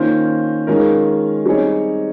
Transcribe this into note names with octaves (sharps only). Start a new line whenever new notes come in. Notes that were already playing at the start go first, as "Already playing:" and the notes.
Already playing: D#3 A#3 C#4 F4 C5
D#3 G#3 C#4 F4 A#4
G3 C4 D#4 G#4 C#5